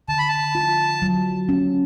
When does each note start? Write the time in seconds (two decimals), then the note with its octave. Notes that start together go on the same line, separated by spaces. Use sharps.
0.08 D3 A5
0.18 B5
0.28 A5
0.55 F4
1.02 F#3
1.49 C#4